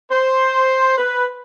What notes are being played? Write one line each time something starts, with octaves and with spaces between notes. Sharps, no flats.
C5
B4